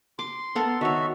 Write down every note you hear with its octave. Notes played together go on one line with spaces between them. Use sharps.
C6 D6
B3 A4 A#4
D#3 F#4 C#5 E5